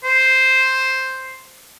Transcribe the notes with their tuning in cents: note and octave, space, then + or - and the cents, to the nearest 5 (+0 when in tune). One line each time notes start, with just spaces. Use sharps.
C5 +0